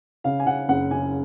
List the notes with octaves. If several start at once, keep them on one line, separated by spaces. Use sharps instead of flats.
C#3 F5
G#5
C#3 F#5
F#1 F#5
C#3 G#5